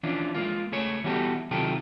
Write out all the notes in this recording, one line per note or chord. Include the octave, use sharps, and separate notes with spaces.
E3 F3 C#4 D4 F4
G#3 A#3 F4
C#2 A3 G#4 C#5
E3 G3 B3 F#4 G4 A4
C3 D#3 F#3 F4 G4 A4